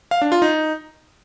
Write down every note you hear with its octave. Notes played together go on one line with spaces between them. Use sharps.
F5
D4
F4
D#4